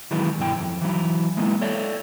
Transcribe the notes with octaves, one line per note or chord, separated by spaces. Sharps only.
D#3 E3 F#3 G#3 B3 E4
G2 B2 E4 G5
F2
E3 F#3 E4
G#3 A#3 B3 E4
A4 C#5 D5 E5